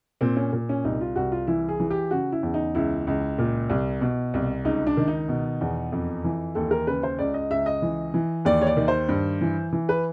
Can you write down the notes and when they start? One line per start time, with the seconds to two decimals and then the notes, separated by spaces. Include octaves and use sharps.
0.21 A#2 C4
0.36 C#4
0.53 A#2
0.69 C#4
0.84 C2 D#4
1.01 F4
1.16 C2 F#4
1.32 F4
1.47 E3 E4
1.69 G#4
1.80 E3
1.90 G4
2.11 C#3 F#4
2.32 E4
2.43 E2
2.54 D#4
2.75 C#2 E4
3.07 C#2
3.38 A#2
3.70 C2
4.01 B2
4.34 C2
4.65 C#2 D#4
4.87 D4
4.97 D#3
5.08 D#4
5.28 B2
5.61 E2
5.92 F2
6.24 E3
6.55 D#2 A4
6.71 A#4
6.87 C#3 B4
7.03 C5
7.19 C#2 D5
7.34 D#5
7.51 C#2 E5
7.66 D#5
7.82 E3
8.14 E3
8.45 D#2 D5
8.61 C#5
8.67 D5
8.77 D#3
8.88 C5
9.09 G2
9.41 E3
9.73 E3
9.89 B4